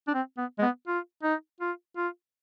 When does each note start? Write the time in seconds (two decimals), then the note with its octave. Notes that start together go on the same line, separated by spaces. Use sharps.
0.08 D4
0.14 C4
0.38 B3
0.59 G#3
0.62 B3
0.88 F4
1.23 D#4
1.61 F4
1.97 F4